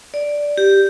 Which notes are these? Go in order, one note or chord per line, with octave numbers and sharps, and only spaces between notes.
D5
G4